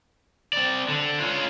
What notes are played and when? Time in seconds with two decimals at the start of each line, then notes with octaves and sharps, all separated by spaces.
0.53 C4 D5
0.89 D3
1.20 C#4 F4